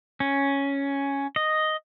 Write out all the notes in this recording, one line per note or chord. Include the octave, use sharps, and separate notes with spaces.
C#4
D#5